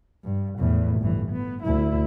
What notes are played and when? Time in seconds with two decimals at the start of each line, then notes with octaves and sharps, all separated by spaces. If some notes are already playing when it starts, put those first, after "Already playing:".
0.24 G2
0.58 E2 A2
1.00 G1 E3
1.31 B3
1.63 D2 E4